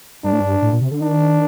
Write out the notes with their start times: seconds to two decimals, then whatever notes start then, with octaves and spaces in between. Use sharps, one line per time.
0.24 G2 D4
0.33 A2
0.40 G2
0.62 A2
0.72 A#2
0.81 C3
0.91 D3
1.01 D#3 D4